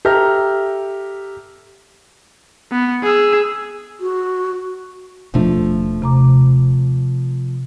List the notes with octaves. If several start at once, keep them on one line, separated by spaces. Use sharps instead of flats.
G4 A4 E5 A#5 F6 A#6
B3
G#4 E6
F#4
D#1 B2 F3 A3 D4
C3 A#5 D6